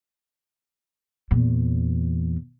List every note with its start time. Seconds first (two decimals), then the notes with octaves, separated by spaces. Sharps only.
1.31 E2 A#2